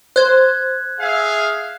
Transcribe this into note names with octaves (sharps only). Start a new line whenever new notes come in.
C5 F#6 G#6
G#4 E5 F5